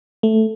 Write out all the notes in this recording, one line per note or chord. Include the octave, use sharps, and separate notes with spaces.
A3